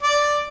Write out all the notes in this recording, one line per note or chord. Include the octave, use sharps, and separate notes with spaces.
D5